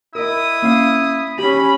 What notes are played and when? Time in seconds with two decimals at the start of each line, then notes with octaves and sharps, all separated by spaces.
0.15 E4 A#4 D#5 D#6
0.62 A#3 C#4 F5
1.39 C#4 G4 B5